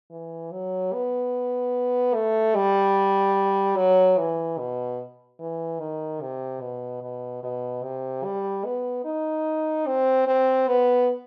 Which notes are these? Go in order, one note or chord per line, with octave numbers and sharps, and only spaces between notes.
E3
F#3
B3
A3
G3
F#3
E3
B2
E3
D#3
C3
B2
B2
B2
C3
G3
B3
D#4
C4
C4
B3